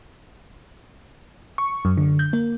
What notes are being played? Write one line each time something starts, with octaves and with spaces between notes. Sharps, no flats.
C#6
F#2
D3
G6
A#3